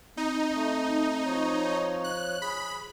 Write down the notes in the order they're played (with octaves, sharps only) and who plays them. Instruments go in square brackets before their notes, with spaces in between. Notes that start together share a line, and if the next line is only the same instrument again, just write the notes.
[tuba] C4 [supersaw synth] D#4
[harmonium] A3
F3 C#5
[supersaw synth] F#6
[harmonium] G#4 [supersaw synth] B5